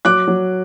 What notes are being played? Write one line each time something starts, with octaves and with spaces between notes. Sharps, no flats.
F#3 D6 F#6
F#3